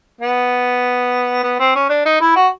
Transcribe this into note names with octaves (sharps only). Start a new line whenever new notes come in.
B3
B3
C4
C#4
D4
D#4
E4
F#4